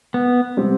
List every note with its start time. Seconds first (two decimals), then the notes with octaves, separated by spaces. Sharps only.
0.14 B3
0.57 C3 G3 C4 G4